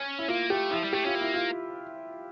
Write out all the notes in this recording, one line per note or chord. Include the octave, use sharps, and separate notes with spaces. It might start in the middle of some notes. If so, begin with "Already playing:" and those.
Already playing: C#4
E4
A#3 F4
A3 G4
F3 E4
G3
A3 G4
C#4 F4
A#3
E4
F4